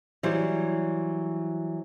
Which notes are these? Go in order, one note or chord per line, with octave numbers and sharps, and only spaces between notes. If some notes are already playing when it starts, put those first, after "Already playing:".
E3 F#3 G3 G4 C5